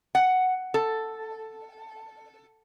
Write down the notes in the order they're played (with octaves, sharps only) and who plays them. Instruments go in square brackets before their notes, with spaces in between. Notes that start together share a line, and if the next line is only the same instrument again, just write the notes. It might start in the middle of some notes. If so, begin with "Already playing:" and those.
[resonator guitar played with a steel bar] F#5
A4